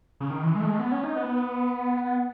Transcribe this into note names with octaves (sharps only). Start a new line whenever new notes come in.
C#3
D#3
E3
G#3
A3
G#3
A3
B3
C#4
D#4
B3